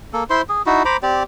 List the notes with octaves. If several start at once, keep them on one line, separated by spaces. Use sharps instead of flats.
A#3 A4
E4 C5 C6
G#4
D#4 E4 F#4
C5 A#5 B5 D6
C4 G4 D5